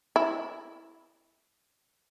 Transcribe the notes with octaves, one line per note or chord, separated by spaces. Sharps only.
E4